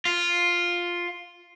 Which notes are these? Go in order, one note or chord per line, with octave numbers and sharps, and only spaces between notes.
F4